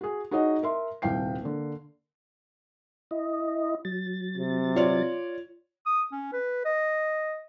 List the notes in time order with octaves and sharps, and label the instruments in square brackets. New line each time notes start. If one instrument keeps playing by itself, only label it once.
[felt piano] F#4 G#4
D#4 F#4 G#4 C#5 D#5 F#5
A#4 E5 C6
D#1 C2 F5 G5 C7
D3 A#3
[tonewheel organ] E4 D#5
F#3 A6
[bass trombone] C3
[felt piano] F4 C#5 D5
[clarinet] D#6
C#4
B4
D#5